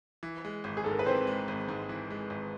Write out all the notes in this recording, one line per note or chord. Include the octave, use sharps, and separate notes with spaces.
E3
G#3
G#1
G#4
G#2 A4
A#4
B4
E3 C4 C5
G#3
G#1
G#2
E3
G#3
G#1